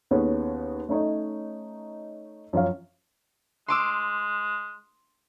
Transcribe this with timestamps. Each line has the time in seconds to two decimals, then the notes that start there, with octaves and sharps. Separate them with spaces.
0.11 D#2 B3 C#4 G#4
0.89 A3 C#4 D#4 C#5 D#5
2.53 F#2 F3 C#4 F5
3.68 G#3 C6 D6 E6